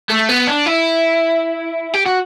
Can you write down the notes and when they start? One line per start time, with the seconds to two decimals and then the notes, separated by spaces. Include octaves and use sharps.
0.10 A3
0.29 B3
0.47 D4
0.66 E4
1.94 G4
2.06 F#4